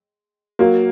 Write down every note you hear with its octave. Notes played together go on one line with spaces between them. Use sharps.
F#3 A#3